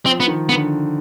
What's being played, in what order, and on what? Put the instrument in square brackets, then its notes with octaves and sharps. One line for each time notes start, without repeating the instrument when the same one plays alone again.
[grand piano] F3 [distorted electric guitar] C4
[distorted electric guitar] B3
[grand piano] D#3
[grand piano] D3 [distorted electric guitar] B3